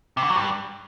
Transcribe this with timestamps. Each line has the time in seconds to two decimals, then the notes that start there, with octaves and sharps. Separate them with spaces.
0.17 C3
0.23 D3
0.30 F#3
0.36 G2